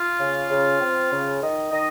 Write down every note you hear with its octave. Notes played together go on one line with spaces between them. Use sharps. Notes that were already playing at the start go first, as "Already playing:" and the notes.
Already playing: F4
C#3
C#3
C4
C#3
D#3 D#5
D#3 D#5